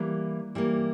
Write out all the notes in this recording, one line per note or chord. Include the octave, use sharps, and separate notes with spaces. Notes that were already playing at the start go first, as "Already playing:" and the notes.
Already playing: E3 G3 A#3
E3 G3 A#3